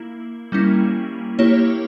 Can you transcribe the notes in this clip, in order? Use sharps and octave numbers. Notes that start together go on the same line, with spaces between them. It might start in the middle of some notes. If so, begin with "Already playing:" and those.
Already playing: A#3 E4
G3 A#3 C#4 E4
A#3 E4 G4 C#5